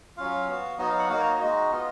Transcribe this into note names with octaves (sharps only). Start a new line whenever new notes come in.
F#3 C#4 F4 F5
B3 F#4
F#3 B3 D#4 F#4 D#5
F5
F#5
A#3 D#4 F#4 F5
C#5
D#5
G#3 D#4 F#4 D#5
B3 F4